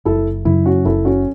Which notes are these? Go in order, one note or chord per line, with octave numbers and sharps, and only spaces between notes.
F#1 E4 A4
F#2 C#3 E4
C#4 F#4
F#1 E4 A4
C#4 F#4